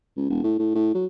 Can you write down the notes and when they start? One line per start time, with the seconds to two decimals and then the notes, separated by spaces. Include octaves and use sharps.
0.17 C#2
0.30 E1
0.44 A2
0.59 A2
0.75 A2
0.95 F#3